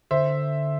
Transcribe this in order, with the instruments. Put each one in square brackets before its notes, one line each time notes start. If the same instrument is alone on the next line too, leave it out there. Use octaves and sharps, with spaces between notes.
[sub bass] D3 [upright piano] C5 E5